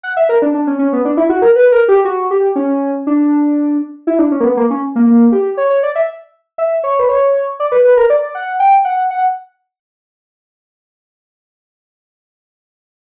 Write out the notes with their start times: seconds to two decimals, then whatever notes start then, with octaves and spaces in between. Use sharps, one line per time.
0.03 F#5
0.17 E5
0.29 A#4
0.42 D4
0.54 D4
0.67 C#4
0.79 C#4
0.93 B3
1.05 D4
1.17 E4
1.29 F#4
1.42 A#4
1.56 B4
1.72 A#4
1.88 G4
2.05 F#4
2.31 G4
2.56 C#4
3.07 D4
4.07 E4
4.19 D4
4.31 C#4
4.40 A#3
4.44 B3
4.57 A#3
4.70 C#4
4.96 A#3
5.07 A#3
5.32 G4
5.57 C#5
5.70 C#5
5.83 D5
5.96 E5
6.58 E5
6.84 C#5
6.99 B4
7.09 C#5
7.60 D5
7.72 B4
7.85 B4
7.97 A#4
8.10 D5
8.35 F#5
8.60 G5
8.85 F#5
9.10 F#5